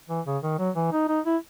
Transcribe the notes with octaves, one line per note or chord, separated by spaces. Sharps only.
E3
C#3
D#3
F#3
E3
D#4
D#4
E4